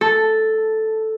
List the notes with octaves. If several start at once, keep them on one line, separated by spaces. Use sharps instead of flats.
A4